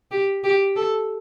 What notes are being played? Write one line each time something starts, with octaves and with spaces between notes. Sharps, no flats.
G4
G4
A4